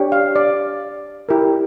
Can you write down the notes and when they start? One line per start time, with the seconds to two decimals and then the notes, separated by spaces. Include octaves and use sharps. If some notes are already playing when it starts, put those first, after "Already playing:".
Already playing: D4 G4 C#5
0.12 F5
0.36 D5
1.29 E4 G4 A#4